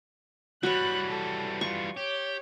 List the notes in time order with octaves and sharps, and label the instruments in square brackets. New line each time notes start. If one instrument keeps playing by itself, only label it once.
[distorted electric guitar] E3 G3 [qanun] F#4 C#5 [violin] B5 F#6
[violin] A4
[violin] F4 [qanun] C#6
[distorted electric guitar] G4 [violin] C#5